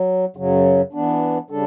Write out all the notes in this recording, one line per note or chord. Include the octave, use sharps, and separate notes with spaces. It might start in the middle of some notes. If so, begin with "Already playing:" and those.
Already playing: F#3
F#2 C#3 F#3
E3 B3 D4
C#3 G3 D4 A4